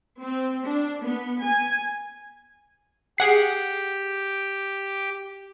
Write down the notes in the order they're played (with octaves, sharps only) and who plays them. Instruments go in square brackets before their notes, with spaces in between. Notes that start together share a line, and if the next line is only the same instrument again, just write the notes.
[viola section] C4
D4
B3
G#5
[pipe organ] G4 [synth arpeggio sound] G#4 F#5 C7